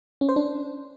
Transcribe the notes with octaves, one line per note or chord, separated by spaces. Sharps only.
C#4
C5
D4